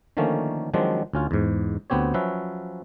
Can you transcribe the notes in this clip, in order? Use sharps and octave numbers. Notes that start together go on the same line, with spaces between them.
D3 D#3 F3 A3 A#3 C#4
D#3 F3 F#3 G#3 C4 D4
D2 C#4 F4
E2 G#2
D2 B3 C4 G4 C#5
F3 F#3 C#4 B4 E5